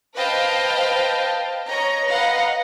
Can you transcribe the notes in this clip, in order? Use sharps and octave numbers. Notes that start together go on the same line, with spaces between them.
B4 C5 D#5 F5 G5 A5
C#5 D#5 A#5
B4 D#5 F5 F#5 A#5